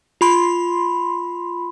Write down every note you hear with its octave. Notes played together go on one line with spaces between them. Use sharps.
F4 B5 C6